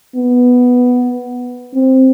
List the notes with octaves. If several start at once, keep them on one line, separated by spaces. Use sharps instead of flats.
B3
C4